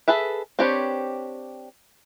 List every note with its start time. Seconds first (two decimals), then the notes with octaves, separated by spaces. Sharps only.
0.08 G#4 A4 B4 E5
0.59 C4 D4 G4 B4 C#5